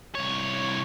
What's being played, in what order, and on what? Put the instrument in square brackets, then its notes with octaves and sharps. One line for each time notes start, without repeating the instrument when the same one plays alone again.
[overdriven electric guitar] C2 C#5